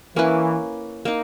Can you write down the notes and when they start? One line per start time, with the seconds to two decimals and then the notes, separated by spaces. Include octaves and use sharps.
0.16 E3 A#3 C#4 E4 B4
1.05 A#3 D#4